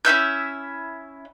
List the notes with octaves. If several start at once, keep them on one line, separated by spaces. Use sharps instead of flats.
C#4 E4 E5 G6